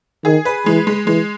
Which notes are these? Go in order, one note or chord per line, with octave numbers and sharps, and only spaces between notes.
D#3 G#4
B4
E3 G#3
G#3
E3 G#3